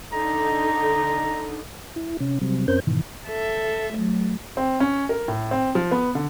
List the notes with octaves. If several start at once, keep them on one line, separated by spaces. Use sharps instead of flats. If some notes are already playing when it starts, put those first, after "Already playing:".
D3 D#4 A#5
E4
C3 C#4
C3 F#3 G3 C4
F#2 C4 C#4 A#4 C5 G6
G#2 B2 D#3 E3
A4 E5
F#3 A3
C4
C#4
A#4
A2
C4
F3
B3
D3